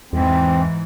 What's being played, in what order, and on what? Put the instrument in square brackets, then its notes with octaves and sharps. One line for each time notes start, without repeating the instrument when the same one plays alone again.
[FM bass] E2 [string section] G#2 E3 [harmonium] C4